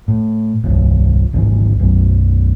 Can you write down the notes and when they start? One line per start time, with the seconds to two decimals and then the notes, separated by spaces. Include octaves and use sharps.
0.08 A2
0.64 D#1 C2 G2
1.33 G#1 D2 G#2 E3
1.80 B1 F#2